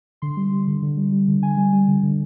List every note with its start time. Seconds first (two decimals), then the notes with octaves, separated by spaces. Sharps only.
0.22 D3 C6
0.37 G3
0.52 G3
0.67 D3
0.82 D3
0.97 G3
1.13 G3
1.28 D3
1.42 D3 G#5
1.57 G3
1.73 G3
1.88 D3
2.03 D3